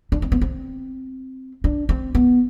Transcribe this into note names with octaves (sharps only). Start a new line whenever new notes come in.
D4
C4
B3
C4
D4
C4
B3